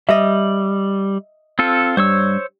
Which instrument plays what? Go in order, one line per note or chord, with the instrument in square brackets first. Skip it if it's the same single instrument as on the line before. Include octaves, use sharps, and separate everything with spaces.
[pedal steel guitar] G3 [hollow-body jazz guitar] D#5 E5
[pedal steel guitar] C4 F4 A4
[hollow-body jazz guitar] G2 [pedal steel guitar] C5 C#5 E6